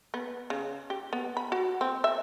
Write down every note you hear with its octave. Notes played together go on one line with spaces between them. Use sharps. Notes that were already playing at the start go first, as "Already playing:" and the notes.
B3
C#3
G4
B3
B5
F#4
C4
E5